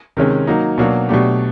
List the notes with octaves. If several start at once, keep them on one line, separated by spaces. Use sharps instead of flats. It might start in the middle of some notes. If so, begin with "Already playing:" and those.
C3 D#3 G#3 C#4
F#3 A#3 D#4
B2 F#3 A#3 D4 F#4
B2 F#3 A3 D4 G4